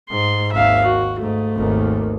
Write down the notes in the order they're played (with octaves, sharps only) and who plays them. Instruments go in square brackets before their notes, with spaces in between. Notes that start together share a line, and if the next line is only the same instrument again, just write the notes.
[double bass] G#2 [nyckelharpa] C6
[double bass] G#1 D#2 [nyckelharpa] E5 F5
[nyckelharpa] F#4
[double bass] G#2 [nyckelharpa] A3
[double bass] G#1 D#2